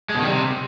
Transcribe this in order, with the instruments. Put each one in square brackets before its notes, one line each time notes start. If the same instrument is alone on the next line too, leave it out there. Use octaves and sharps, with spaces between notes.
[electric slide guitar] G#3
B2
D#3
G3
C3